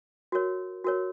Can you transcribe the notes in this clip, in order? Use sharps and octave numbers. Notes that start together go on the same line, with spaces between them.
F#4 A#4 C#5
F#4 A#4 C#5